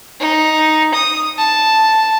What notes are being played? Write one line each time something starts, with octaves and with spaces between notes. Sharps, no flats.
D#4
D#6
A5